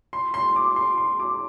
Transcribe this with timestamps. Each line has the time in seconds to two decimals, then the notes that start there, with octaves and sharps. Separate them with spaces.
0.13 C6
0.34 C6
0.56 D6
0.76 C6
0.98 C6
1.20 D6